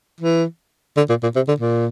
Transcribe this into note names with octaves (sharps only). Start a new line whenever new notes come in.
E3
D3
A#2
A#2
C3
D3
A#2